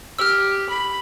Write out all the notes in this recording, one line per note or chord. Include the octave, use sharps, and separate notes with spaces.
G4 E6 F6
B5